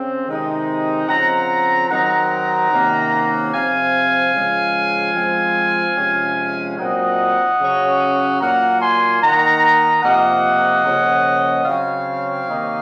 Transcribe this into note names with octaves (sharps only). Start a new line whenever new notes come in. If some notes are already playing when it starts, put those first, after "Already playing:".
Already playing: C#3 C4
C3 D#3 G#3 C4 D#4
C#3 F3 C4 F#5 A#5
D#3 F#3 C4 D#4 F#5 A#5
C3 D#3 A#3 C#4
C3 F3 C4 F5 G#5
C#3 F3 G#3
F3 G#3 C4
C3 F3 G#3 C#4
A#2 F#3 C4 D#4 D#5 F#5
C#3 F#3 C#4
A#2 F#3 A#3 F#5 A#5
G#5 C6
D#3 A#3 D#4 F#5 A#5
C3 F3 A#3 D#5 F#5
C#3 F3 A#3 C#4
C#3 F#3 C4 C#5 F5
C3 D#3 A#3 D#4